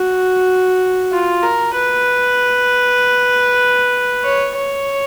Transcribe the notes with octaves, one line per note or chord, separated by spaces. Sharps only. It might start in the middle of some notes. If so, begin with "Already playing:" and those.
Already playing: F#4
F4
A#4
B4
C#5
C#5